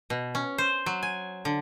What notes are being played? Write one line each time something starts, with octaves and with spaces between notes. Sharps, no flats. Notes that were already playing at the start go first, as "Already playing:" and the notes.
B2
C#4
C5
F#3
G#5
D3